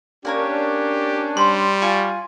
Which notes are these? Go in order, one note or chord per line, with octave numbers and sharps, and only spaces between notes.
A#3 C#4 D4 G4 A#4 C#5
G3 C5 C6
F4 G#5 C#6